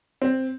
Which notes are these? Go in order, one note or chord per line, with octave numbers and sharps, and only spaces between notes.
C4